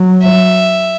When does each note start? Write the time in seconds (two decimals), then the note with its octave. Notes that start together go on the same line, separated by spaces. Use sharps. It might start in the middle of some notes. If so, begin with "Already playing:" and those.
Already playing: F#3
0.22 E5